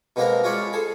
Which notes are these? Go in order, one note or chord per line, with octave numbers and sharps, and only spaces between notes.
B2 G#3 A#3 C4 A#4 A#5
G#3 F4 C#5 D5 E5
G#4 A4